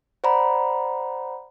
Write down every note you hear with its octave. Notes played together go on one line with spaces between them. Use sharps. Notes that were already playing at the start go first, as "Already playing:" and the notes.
C5 D5 F#5 A#5 B5